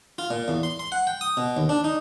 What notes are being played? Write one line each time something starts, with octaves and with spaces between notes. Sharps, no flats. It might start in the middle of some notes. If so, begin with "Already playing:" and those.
F4
A#2
E2
C6
C6
F#5
G5
D#6
B2
D#2
D4
D#4